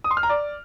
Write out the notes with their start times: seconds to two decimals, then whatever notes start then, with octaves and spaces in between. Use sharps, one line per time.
0.04 D#6
0.11 C6
0.17 F6
0.23 A#5
0.29 D5